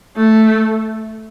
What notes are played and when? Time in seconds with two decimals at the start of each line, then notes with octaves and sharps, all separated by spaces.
0.16 A3